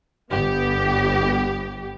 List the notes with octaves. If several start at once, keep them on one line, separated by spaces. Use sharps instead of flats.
G1 B3 G4